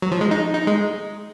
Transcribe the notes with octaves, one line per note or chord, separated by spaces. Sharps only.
F#3
F3
G#3
D#4
D#4
G#3